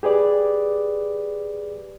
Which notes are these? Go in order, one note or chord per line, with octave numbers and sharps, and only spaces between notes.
G4 G#4 B4 D5